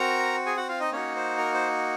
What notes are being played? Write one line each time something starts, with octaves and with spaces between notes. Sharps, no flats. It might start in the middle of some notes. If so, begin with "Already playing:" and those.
Already playing: C4 F#4 A#4 A#5
G#4 G#5
F#4 F#5
F4 F5
D#4 D#5
A#3 C#4 D#4 F#4 C#5
C5
A#4
C5